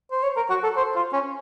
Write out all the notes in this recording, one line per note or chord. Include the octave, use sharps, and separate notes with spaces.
C5
C#5
A#4
F#4
A4
C5
F4
C#4